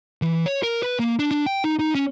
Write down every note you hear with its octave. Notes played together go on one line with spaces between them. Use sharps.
E3
C#5
A#4
B4
A#3
D4
D4
G5
D#4
D#4
C#4